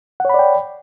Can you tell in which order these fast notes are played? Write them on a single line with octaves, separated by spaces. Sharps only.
F#5 C#5 B5 D5 G5